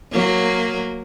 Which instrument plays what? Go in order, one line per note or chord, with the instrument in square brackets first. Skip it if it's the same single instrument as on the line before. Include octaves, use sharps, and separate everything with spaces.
[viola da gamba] F#3 A#3